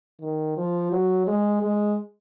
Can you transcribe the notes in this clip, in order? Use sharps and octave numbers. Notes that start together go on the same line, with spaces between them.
D#3
F3
F#3
G#3
G#3